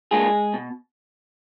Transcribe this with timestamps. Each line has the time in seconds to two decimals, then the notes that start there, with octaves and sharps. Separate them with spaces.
0.11 G#3 A#3 D4 F4 G#4
0.54 B2